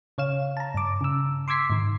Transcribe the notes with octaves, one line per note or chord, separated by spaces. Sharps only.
C#3 C#5 F5 E7
A5 A#5
G2 D6
C#3 E6
C6 D6 E6 G#6 B6 C7
G#2 D#3